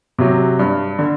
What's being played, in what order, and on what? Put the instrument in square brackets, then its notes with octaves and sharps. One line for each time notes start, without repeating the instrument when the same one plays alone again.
[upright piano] C3 F#3
G2
D3